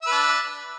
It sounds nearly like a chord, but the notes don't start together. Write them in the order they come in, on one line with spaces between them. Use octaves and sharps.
E5 B4 D4